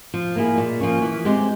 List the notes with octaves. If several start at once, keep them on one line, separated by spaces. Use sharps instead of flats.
F3
A#3 E4 G#4
A#2
F3 A#3 C#4
E3
G#3 C4 G4